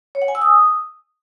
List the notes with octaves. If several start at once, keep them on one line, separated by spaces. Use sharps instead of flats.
C#5
F#5
G#5
E6
D#6